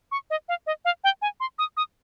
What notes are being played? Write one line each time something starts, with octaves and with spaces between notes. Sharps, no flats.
C#6
D#5
F5
D#5
F5
G5
G#5
C6
D#6
D#6